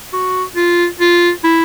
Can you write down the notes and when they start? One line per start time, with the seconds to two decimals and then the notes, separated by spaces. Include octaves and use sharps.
0.13 F#4
0.56 F4
1.00 F4
1.44 E4